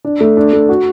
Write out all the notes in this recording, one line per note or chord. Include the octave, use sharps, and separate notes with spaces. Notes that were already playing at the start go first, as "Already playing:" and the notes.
D4
A3
D4
A3
F#4